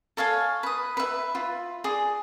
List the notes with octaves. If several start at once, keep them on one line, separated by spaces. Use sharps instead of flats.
A4 C#5 F5 G#5
B4 D#6
B4 E5
F4
G#4 D5